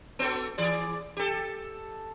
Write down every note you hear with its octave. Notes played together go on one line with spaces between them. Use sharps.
B3 F#4 A4
E3 G#4 D5
G4 A4